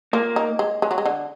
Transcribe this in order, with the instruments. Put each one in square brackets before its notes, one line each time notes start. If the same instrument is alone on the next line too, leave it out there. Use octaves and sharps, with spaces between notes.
[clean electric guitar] A#3 [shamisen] F4
[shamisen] D#4
G#3
G#3
F#3
G#3
D3